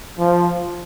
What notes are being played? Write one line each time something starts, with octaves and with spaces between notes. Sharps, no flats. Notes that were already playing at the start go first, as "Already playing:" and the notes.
F3